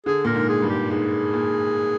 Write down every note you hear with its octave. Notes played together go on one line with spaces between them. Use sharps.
D3 G#4
A#2 A#4
G#2
G#4
G2
G4
G#2 G#4
A#2